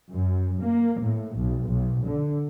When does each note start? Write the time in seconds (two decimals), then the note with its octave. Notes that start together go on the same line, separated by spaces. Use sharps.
0.11 F#2
0.62 A#3
1.02 A2
1.36 B1
1.68 B1
2.06 D3